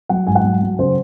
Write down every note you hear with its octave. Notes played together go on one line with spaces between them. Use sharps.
F#3 F#5
G#2 G#5
F#5
F#3
F#3
C#3 C5